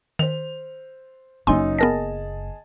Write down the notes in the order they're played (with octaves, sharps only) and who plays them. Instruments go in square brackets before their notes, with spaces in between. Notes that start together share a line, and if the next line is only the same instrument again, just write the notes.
[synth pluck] D#3 [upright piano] C5 F7
[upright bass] F#1 A#3 [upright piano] F#2 D#4 [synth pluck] G#5 C6
[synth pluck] B3 A#4 A#6 [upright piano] G#4 D#5 A5